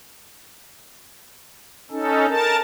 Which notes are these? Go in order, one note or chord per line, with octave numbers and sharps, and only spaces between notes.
C#4 D#4 A4
A#4 A5